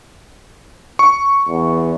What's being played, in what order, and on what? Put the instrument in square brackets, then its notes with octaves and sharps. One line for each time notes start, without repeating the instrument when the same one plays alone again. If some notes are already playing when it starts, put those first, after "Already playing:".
[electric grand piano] C#6
[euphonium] E2